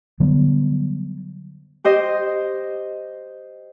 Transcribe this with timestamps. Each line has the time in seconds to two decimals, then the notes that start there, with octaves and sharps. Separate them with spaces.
0.20 D3 F#3 G3 B3
1.84 G4 C5 D#5